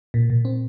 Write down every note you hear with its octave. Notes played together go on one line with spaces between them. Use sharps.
A#2
A#2
C4